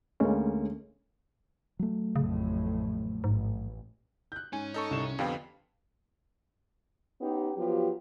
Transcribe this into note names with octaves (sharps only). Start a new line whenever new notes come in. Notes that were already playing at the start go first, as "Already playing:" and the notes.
D2 G#3 A#3 C#4
F#3 A3
A1 F2 A2 C#3
A1 G#2
F#6 G6
G#2 C#4 G#5
D#4 A4 C#6
C2 E7
F2 D3 B3 G4 F5 G5
B3 C#4 D#4 G4
F3 F#3 B3 F4 G4